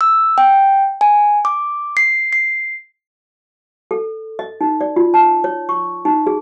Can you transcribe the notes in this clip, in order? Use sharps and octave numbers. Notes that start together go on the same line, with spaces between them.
E6
G5
G#5
D6
C7
C7
A4
D#5
D#4
D5
F4
A5
C#5
C#6
D#4
G#4